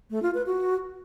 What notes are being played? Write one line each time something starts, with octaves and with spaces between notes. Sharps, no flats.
A3
F4
B4
F#4